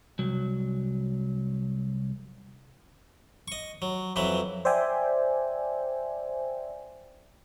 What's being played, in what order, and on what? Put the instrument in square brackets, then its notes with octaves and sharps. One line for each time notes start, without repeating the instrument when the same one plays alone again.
[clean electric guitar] C2 F#3
[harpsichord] D#5 C#6
F#3
F2 E3 F#3 B4
[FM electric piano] C5 D5 E5 G5 G#5